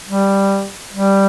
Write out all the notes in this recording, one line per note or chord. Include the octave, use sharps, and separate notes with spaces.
G3
G3